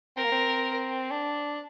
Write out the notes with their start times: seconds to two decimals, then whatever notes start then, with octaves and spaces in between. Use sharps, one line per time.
0.17 C4 A#4
0.25 A#3
0.32 C4
1.11 D4